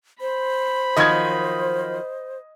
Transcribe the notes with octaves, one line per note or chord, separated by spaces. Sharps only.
C5 B5
D#3 F3 F#3 D#5 G#6